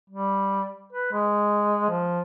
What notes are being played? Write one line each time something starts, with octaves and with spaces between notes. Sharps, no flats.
G3
B4
G#3
F3